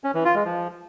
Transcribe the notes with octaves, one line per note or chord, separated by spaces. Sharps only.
C#4
E3
F4
G#3
F3